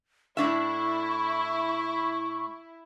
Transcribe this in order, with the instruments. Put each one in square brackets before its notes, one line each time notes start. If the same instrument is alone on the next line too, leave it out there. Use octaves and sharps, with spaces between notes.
[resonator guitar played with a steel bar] A2 D4 E5 [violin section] E4 [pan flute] C#6